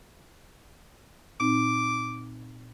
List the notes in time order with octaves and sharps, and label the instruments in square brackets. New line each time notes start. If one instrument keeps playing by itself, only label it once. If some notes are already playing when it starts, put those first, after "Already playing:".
[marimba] A#2 C4 D#4 [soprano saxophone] D6